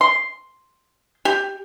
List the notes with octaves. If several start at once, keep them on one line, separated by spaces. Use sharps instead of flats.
C6
G4